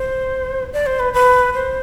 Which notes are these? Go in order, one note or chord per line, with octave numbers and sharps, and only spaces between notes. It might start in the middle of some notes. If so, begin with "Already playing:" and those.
Already playing: C5
D5
C5
B4
B4
C5